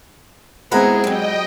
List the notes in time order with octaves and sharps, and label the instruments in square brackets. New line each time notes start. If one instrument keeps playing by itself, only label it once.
[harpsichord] G#2 F#4 B4 [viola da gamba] B3 C4 G#4 [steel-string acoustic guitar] E4 A#5
[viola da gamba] F#3 [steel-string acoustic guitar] G3 C4 [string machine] D#5 G5